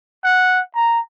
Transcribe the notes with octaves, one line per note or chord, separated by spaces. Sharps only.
F#5
A#5